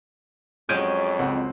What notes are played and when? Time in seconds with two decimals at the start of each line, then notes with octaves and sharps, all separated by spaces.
0.69 F2 F#3 G#3 C#4 G6 D7 D#7
1.19 C#2 C4 F#5